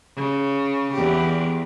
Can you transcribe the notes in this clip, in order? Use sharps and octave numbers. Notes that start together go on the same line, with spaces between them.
C#3
E2 G4